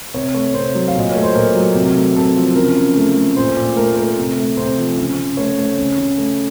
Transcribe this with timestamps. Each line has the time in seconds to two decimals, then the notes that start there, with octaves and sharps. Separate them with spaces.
0.14 C3 C#5
0.34 A3 C#5
0.54 C3 C5
0.75 F#3
0.88 F5
0.95 A#2 D#5
1.11 A3 C#5
1.24 C5
1.35 A#2 A#4
1.55 F#3
1.75 C3
1.95 A3
2.16 C3 A4
2.36 F3
2.56 C#3 A#4
2.76 C#3
2.96 A3
3.16 A3
3.36 A#2 C5
3.56 A#2
3.76 A3 A#4
3.96 A3 A#4
4.17 C3
4.37 A3
4.57 C3 C5
4.77 F3
4.97 C#3
5.17 C#3
5.37 A3 C#5
5.58 A3
5.78 C#3
5.98 C#3
6.17 A3